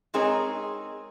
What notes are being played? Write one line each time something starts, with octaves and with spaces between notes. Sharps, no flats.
G#3 C4 D#4 G#4 A#4 C#5